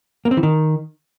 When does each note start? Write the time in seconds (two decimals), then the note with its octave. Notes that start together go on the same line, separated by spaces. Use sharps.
0.25 A#3
0.31 C4
0.37 E3
0.43 D#3